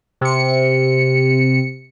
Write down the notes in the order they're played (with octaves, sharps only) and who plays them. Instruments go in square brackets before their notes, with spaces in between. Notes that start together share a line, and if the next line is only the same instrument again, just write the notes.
[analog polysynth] C3 C#7